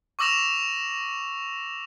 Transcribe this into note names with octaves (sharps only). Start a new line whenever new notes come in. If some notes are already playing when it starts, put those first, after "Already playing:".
C#6 D6 E6 A#6 E7 F7